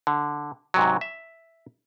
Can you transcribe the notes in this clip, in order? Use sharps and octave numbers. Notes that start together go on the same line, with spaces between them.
D3
G#2 C3 F#3
E5